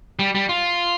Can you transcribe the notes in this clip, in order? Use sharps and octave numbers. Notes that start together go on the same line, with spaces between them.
G3
G3
F4